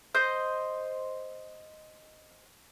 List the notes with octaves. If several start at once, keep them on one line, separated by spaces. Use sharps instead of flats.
C5 D#5 G6